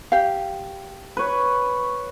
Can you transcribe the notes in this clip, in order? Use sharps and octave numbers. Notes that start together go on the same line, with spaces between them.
G4 F5
B4 C#5